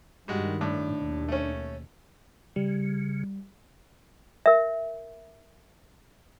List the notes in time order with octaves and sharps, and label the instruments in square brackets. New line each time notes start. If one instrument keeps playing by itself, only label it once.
[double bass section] G2 D#3 [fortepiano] G3 G#3 F#4
[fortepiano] A2 [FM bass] D4
[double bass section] D#2 B2
[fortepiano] A3 C#4
[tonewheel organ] C#3 [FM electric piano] G3
[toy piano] A#4 E5